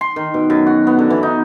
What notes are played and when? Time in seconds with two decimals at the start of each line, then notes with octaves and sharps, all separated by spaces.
0.01 C6
0.16 D#3
0.34 B2
0.50 F#2
0.67 F#4
0.87 B3
0.99 D3
1.10 E3
1.23 D#4